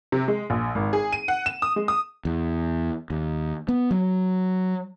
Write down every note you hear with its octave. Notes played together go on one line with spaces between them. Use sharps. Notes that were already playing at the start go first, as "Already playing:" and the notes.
C3
G#3
A#1
G#1
G#4
D#7
F#5
E7
D#6
G#3
D#6
E2
D#2
B3
F#3